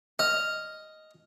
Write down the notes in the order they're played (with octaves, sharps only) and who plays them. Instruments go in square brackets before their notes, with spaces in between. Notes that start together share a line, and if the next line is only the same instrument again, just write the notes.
[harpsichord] D#5 [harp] F6